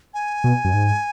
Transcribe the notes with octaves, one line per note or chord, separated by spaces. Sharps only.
G#5
B2
F#2
G#2